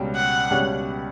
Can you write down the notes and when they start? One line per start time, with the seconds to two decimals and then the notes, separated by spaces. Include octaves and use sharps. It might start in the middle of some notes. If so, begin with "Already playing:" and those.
Already playing: C#2 B2 G3 C#4 G4
0.16 F#5
0.50 C#2 B2 G3 C#4 G4